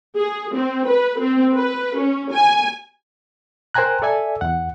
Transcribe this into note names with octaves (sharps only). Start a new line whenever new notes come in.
G#4
C4
B4
C4
B4
C#4
G#5
A#4 C5 G5 G#5 A#5 F#6
A4 D5 E5 G#5
E2 F#5